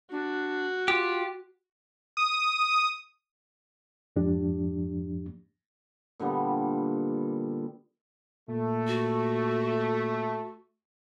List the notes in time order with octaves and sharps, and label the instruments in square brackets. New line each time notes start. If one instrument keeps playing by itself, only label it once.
[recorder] D4 [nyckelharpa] F#4
[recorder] F4 [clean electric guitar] G4
[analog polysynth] D#6
[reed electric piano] F2 G#2 F3 D4 G4
[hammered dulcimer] A#2 D3 G3 B3
[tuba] A#2 [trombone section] A3
[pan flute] F#4